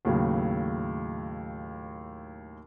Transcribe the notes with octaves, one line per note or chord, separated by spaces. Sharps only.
D#2 A2 C#3 F#3